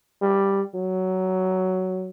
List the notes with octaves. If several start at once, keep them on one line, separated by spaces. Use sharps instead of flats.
G3
F#3